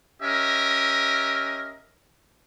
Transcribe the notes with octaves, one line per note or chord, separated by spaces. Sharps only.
C#4 G4 A#4 D#5 E5